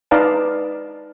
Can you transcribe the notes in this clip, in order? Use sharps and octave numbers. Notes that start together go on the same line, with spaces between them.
D#4 B4 D5 F5 A5